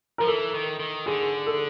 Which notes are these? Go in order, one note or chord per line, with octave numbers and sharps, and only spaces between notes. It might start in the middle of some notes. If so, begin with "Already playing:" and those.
F3 A#4
E3 A4
D#3
D#3
D3 G#4
A4